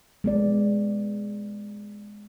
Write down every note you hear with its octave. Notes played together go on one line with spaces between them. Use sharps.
G#3 B3 D5